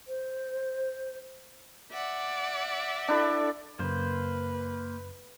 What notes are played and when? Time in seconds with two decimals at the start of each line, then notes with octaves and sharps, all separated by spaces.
0.08 C5
1.93 D5 E5 F#5
3.08 D4 E4 A4
3.79 F#2 C#3 A#3 B4 C5